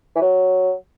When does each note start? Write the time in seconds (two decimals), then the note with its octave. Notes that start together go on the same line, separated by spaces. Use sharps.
0.15 E3
0.21 F#3